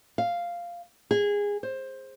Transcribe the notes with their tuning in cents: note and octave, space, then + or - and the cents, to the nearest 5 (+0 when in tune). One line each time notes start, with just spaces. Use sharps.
F5 -5
G#4 -20
C5 +15